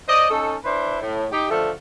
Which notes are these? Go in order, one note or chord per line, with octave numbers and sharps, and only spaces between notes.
C5 D5 D#5
C#4 D#4 A4
D4 E4 B4 C5
A2
D#4 G4
D3 F3 A3 A4